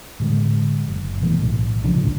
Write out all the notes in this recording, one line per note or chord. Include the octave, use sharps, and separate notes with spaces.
A2 D3 G#3
F#1
B2 E3 G3 A3
B1 A2
A2 C#3 F3 D4
G#1 D2 A#2